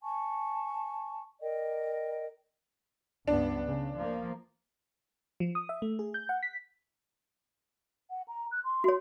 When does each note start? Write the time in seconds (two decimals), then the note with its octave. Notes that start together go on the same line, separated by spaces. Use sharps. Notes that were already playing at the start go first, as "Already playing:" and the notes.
0.03 G#5 A5 C#6
1.41 A#4 D5 D#5 G5
3.28 C#2 G2 B3 D4
3.66 C#3
3.96 F3 A#3
5.40 F3
5.55 D#6
5.69 E5
5.82 A3
5.99 G#4
6.14 G6
6.29 F#5
6.43 B6
8.10 F#5
8.28 A#5
8.51 F#6
8.64 C6
8.84 F#4 C#5